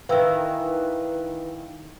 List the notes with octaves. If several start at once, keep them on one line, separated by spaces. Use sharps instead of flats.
D#3 E3 B4 F5 G5 E6